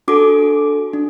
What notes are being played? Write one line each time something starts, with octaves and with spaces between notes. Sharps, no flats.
D4 F#4 A4 D6
D4